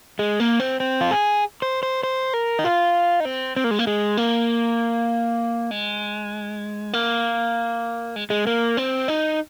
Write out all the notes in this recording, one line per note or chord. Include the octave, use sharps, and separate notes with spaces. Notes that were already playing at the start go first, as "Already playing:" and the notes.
G#3
A#3
C4
C4
F4
G#4
C5
C5
C5
A#4
D#4
F4
D#4
C4
C4
A#3
G#3
A#3
G#3
A#3
G#3
A#3
G#3
G#3
A#3
C4
D#4